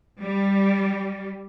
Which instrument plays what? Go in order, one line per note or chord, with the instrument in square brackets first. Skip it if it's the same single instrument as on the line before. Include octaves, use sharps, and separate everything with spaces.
[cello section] G3